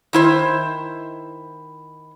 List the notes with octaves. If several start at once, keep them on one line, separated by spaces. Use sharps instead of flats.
D#3 E4 C5